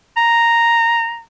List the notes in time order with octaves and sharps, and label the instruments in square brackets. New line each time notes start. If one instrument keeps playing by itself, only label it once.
[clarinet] A#5